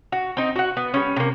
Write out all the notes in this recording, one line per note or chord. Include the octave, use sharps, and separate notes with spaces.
F#4
C4 D#4
F#4 F#5
B3
G3 C#4
C3 A#3